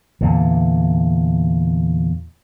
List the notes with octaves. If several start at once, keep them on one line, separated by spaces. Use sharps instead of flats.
E2 A#2 D3